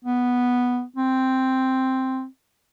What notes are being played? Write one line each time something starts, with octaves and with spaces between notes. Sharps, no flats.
B3
C4